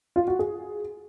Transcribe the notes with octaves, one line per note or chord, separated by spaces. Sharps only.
F4
F#4
G#4